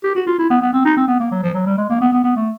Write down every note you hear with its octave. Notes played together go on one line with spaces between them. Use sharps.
G4
F#4
F4
E4
B3
B3
C4
D#4
C4
B3
A#3
F#3
F3
F#3
G3
G#3
A#3
B3
B3
B3
A3